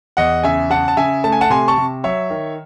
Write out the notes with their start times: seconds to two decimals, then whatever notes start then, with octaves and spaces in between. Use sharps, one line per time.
0.17 E2 D#5 F#5
0.43 C#3 E5 G#5
0.70 C#3 F#5 A5
0.88 A5
0.97 C#3 E5 G#5
1.24 A3 A5
1.32 G#5
1.41 F#5 A5
1.50 C3 G#5 C6
1.68 A5 C#6
1.78 C3
2.04 F#3 C#5 E5
2.30 D#3